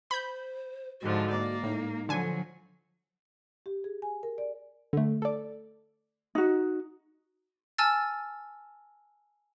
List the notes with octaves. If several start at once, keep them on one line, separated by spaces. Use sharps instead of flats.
C5 B5 G6
G#2 D3 F3 F#4
A#3 D5
A2 G#3 D#4
D3 F3 F#3 G#5
G4
G#4
G#5
A#4
D5
D3 A3
A4 D5
D#4 F#4
G#5 A5 E6 F6 A6